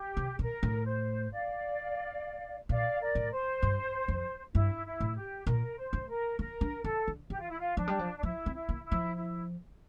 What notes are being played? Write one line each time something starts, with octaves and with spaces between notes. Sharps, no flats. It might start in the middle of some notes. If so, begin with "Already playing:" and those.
Already playing: G4
C3
A#2 A#4
A2
C5
D5 F5
A#2 D5 F5
A#4 D5
A2
C5
G2
F2
G2 E4
E4
A2
G4
A#2 A#4
C5
A3
A#4
A#3 A#4
D4
C4 A4
D3
E3 G4
F4
E4
F4
F3 D4
G3
F3
D4
F3 E4
C4
E4
A#3
E4
F3
E4